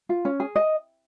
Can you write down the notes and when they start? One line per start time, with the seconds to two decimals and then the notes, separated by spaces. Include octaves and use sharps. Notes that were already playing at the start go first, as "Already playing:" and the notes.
0.09 F4
0.25 C#4
0.40 G#4
0.56 D#5